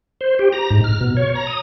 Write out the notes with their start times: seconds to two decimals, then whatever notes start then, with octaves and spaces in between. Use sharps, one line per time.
0.21 C5
0.39 G4
0.52 A#5
0.70 G#2
0.84 F6
1.01 B2
1.17 C#5
1.35 A#5
1.47 D#6